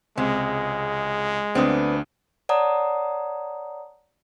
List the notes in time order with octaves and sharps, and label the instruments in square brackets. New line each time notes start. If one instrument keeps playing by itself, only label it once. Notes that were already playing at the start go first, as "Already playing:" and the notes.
[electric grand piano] C#2 [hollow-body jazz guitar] C3 [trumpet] G#3
[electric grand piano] D2 D4 D#6 [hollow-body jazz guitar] B3 C4
[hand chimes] C#5 D5 F#5 A5 A#5 D#6